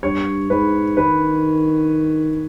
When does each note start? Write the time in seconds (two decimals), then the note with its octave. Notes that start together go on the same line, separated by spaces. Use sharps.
0.03 G2 C#5
0.50 G#2 B4
0.97 D#3 B4